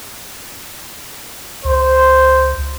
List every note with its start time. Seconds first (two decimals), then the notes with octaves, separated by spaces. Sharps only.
1.65 C#2 C5